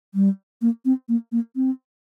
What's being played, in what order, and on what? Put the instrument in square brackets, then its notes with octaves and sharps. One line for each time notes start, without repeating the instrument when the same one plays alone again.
[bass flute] G3
A#3
C4
A#3
A#3
C4